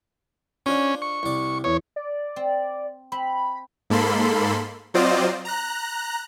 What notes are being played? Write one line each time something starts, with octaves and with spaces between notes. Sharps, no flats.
C#4 D4 F4 C5
C#6
C2 D5
E2 C#5
D5
C4
C4 B5
G#2 A#3 A4 B5 C6
F#3 C4 F4 C5 D5 D#5
A#5 F#6